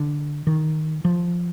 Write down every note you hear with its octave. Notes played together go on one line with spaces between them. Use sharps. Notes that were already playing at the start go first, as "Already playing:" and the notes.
Already playing: D3
D#3
F3